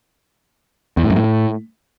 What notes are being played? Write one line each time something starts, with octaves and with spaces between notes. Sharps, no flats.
E2
A2
F#2
A2